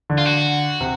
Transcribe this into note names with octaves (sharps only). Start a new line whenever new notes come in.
D3
F4
F#4
C3